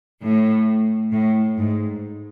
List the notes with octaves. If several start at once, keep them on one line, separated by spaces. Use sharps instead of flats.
A2
A2
G#2